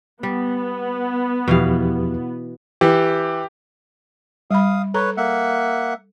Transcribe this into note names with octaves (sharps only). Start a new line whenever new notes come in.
G3 B3
E2 B2 E3 F3 G4 F5
E3 G4
G3 F5 B5 D#6
A4 B4 C#5 A#5
A#3 E5 F#5